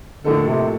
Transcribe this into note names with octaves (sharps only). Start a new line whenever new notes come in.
A2 D3 F3 A#3 D#4 A4
C3